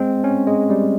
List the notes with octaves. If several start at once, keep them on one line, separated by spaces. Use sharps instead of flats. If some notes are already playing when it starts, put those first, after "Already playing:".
Already playing: G#3 C4
C#4
G#3
G3